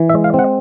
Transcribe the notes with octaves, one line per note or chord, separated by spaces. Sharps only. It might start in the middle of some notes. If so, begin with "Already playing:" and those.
Already playing: E3
E5
G#3
F5
C4
F#5